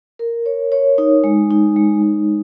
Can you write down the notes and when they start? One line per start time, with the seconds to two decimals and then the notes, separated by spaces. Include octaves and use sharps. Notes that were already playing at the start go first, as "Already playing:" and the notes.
0.19 A#4
0.46 C#5
0.72 C#5
0.98 D#4
1.24 G#3
1.50 D#4
1.76 G#3
2.03 G#3